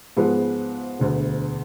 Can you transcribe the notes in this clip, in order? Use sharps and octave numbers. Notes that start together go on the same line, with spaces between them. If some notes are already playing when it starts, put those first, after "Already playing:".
G#2 F3 G#3 B3
E1 D2 D3